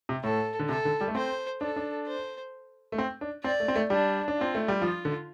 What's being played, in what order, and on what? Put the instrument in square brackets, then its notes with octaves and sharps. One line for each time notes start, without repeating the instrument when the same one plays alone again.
[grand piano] C3
[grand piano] A2 [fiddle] A4
[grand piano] D3
[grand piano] C3 [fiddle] A4
[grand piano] D3
G3
A3
[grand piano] C4 [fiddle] C5
[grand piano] D4 [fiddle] A4
[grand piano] D4
[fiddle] C5
[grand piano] A3
C4
D4
[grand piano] C4 [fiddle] D5
[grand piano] A3
C4
A3
[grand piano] G3 [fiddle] D4
[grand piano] D4
[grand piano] C4 [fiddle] F4
[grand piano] A3
G3
[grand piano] F3 [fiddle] F4
[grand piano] D3